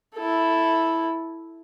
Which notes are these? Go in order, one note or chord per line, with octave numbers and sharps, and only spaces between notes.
E4 A4